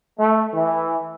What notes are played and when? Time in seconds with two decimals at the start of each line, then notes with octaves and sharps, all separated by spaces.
0.17 A3
0.54 E3